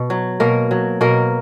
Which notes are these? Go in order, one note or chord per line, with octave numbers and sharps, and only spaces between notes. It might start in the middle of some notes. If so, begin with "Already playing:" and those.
Already playing: B2
F#3
B2 A#3 A#4
F#3
B2 A#3 A#4